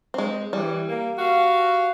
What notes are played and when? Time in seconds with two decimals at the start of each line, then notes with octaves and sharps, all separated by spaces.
0.14 G#3 C4
0.53 E3 G3
0.88 A#3
1.19 F#4 F5